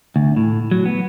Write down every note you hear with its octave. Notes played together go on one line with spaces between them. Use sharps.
D2
A2
F#3
B3